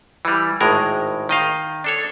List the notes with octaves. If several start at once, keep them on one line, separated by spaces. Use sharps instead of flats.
E3 G3
G#1 A2 G#3 A#4
D#3 D#5 F5
D4 A4 C#5